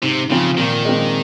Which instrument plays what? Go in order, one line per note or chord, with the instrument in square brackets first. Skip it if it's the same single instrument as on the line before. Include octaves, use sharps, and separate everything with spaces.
[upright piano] G#2 [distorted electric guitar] C3
[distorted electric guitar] C#3 [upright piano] F3 C4 F4
[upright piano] A#2 [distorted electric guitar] D#3
[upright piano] G#3 C4